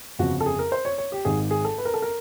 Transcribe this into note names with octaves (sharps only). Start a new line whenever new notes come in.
G1 F2 C#3 F#4
A4
G#4
A#4
C5
C#5
C#5
G4
G#1 G#2 D#3 G#4
G#4
A4
B4
A#4
A4
A#4